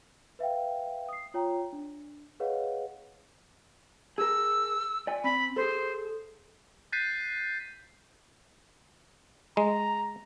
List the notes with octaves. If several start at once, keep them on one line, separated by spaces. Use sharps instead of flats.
B4 E5 F5 G5
D#6 C7
F4 C#5 G5 A#5
D4
G#4 B4 C#5 D#5 F5 F#5
G#4 A#4 E6
D5 G#5
C4 B5
G#4 A4 C5
F#6 G6 A6 B6 C7 D#7
G#3 A#5